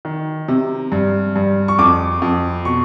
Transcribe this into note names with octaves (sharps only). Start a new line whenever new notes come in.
D#3
C3
G2
G2
C#6
F2 D6
F2
B2 C#6